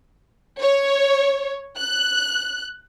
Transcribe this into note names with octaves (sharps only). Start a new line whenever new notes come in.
C#5
F#6